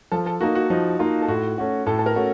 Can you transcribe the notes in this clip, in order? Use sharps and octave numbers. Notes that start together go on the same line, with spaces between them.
F3 A4
A4
A#3 D#4 F#4
F#4
F3 D#4
A#3 D#4 F4
A4
A2 F#4
A3 C#4 F#4
A2 A4
A4
A#4
A3 C#4 F#4